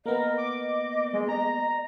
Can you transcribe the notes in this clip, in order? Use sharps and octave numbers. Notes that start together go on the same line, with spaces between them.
A#3 B3 A#4 D#5
D6
G#3
A#5